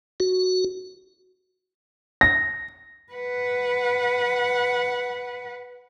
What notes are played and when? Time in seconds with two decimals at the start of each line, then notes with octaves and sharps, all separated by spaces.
0.20 F#4
2.21 A#6
3.13 B4 F#5